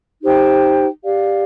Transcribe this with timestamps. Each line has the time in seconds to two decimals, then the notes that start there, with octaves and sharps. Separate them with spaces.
0.22 D#4 G4 C5 G5
1.03 G4 D5 F5